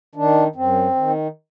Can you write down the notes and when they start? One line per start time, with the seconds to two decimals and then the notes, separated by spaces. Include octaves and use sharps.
0.15 D#3 D4
0.56 F#2 C4
0.95 D#3